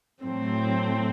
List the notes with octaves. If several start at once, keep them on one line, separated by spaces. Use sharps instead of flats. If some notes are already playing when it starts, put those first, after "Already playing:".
A2 F#3 A3 C4